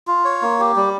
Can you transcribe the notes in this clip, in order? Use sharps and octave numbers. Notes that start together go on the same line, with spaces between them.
F4
C#5
A#3
G4
G3